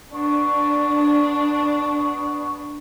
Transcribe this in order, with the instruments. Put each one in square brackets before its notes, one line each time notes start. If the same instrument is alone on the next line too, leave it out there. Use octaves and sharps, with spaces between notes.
[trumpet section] B3 C#6 [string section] D4